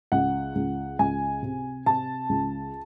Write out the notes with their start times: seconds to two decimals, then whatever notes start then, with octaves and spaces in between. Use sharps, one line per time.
0.12 C#2 F#5
0.55 C#2
0.99 C#2 G#5
1.42 C3
1.86 C3 A5
2.29 C#2